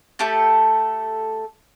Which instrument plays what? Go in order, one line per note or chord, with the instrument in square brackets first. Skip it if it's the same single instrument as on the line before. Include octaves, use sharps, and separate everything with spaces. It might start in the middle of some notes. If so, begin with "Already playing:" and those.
[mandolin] A3 G4 A4 G6